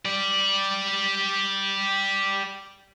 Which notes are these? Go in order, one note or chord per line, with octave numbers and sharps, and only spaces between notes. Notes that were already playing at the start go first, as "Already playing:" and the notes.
G4 D5